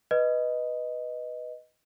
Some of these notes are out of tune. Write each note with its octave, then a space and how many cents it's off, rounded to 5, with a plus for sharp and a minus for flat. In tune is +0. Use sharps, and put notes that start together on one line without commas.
B4 +0 D#5 +0